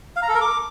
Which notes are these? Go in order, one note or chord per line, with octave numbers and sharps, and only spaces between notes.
F5
A#5
A4
A#4
D6